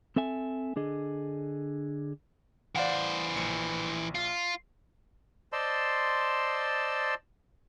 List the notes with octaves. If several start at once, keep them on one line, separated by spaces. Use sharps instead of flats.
C4 A4 E5 G#5
D3 D4 G#4 D#5
E3 C5 D5 F5 F#5
A#1 C#7
F4
C5 D5 D#5 A5 C6 E6